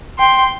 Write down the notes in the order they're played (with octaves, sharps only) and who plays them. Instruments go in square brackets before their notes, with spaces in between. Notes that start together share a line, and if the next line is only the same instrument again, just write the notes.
[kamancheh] G5 [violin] C6